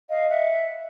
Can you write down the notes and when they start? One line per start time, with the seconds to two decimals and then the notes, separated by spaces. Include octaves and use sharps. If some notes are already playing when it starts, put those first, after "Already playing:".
0.10 D#5 F5
0.30 E5 F#5